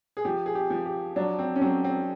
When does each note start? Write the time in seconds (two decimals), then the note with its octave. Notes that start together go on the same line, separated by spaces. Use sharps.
0.17 G#4
0.25 F3 G4
0.46 G#4
0.55 G4
0.70 F3
0.86 G4
1.16 F#3 D4
1.39 C4
1.56 C#4
1.61 F#3 C4
1.84 C4